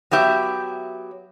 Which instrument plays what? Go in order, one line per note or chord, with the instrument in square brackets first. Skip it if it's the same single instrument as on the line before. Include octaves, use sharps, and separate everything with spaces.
[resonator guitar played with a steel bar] F#3 B3 G4 E5